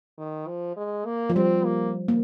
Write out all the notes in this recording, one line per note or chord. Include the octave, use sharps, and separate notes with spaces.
D#3
F3
G#3
A#3
F3
G3 C4
A#3
A#3